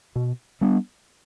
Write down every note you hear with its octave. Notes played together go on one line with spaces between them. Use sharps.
B2
G3 B3 D4